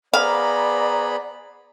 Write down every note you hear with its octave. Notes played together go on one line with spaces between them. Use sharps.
B3 G#4 C5 D5 F5 A#5 B5 D6